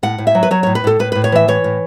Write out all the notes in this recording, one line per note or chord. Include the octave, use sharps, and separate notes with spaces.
A2 F#5
A2
E5
F#3
B4
F#3 C#5
A2 C#5
B4
A2 A4
A2 B4
A2 B4
C#5
E3 E5
E3 C#5
A2